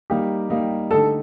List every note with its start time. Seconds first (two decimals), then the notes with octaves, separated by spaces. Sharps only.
0.10 G3 A#3 D#4 G4
0.50 G3 A#3 D#4
0.90 D3 A3 D#4 G4 A4